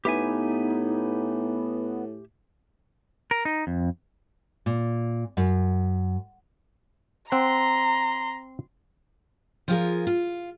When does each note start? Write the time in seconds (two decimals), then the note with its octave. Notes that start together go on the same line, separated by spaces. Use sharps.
0.05 A2 B3 D#4 G4 E5 G#5
3.31 A#4
3.45 D#4
3.67 F2
4.66 A#2
5.37 F#2
7.32 C4 F#5 A#5 C6
9.68 F3 F4 G#4 A#4
10.07 F4